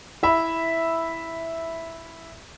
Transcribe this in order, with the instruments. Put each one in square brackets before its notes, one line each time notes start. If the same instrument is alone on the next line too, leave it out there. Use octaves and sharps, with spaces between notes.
[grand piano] E4 E5 B5